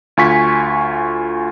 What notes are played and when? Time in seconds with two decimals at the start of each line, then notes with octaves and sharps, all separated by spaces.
0.17 D2 F4 G#5 C#6 B6